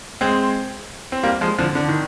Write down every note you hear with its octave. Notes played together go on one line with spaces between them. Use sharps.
G#3 C4
C4
G3 A#3
F3 G#3
D3 F3
D3
D#3